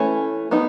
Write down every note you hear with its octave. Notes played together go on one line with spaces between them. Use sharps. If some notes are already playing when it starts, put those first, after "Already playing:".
Already playing: E3 A3 C#4
F#3 B3 D#4